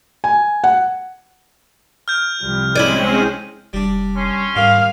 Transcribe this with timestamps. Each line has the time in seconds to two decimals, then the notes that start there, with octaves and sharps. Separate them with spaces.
0.24 G#5
0.64 F#5
2.08 F6 G6
2.42 C2 F3 G3
2.75 G#3 C4 C#4 E4 C#5 D5 D#7 F#7
3.73 F1 G3 D4
4.16 C#4 C6
4.56 G#2 G3 A#3 F5